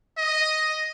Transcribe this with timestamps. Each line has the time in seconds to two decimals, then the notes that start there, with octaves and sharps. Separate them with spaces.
0.17 D#5